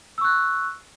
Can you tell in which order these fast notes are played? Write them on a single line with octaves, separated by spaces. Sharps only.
E6 C#6 F#6